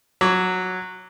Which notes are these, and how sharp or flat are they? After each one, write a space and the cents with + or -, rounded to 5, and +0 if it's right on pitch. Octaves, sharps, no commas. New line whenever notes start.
F#3 -10 D6 -30